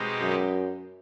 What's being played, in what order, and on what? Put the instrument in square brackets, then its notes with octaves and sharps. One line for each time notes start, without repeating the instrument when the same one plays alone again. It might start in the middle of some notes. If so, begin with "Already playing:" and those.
Already playing: [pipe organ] B2 G#3 C4 D#4 G4
[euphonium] F#2